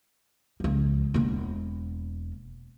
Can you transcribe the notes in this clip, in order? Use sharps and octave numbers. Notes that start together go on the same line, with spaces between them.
C#2 F3
E1 A#3